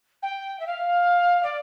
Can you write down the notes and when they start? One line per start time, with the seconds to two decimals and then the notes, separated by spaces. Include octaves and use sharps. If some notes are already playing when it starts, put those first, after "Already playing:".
0.22 G5
0.59 E5
0.66 F5
1.43 D5